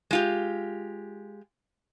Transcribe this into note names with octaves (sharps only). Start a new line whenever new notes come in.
G#3 F4 G4